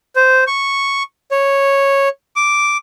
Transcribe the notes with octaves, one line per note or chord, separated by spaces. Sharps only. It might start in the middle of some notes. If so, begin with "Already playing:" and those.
C5
C#6
C#5
D6